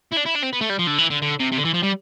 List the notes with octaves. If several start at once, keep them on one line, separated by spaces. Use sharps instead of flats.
E4
D4
E4
D4
C4
B3
A3
G3
F3
D3
E3
D3
D3
C3
C3
D3
E3
F3
G3